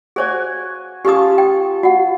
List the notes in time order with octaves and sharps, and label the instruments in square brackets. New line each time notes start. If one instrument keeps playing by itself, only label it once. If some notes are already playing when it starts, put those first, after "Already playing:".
[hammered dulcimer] F#4 G#5 [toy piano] G#4 C5 C#5
[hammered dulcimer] C#4 F4 A5 [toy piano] G4 G#4 D#6
[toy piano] G5
F#4 F#5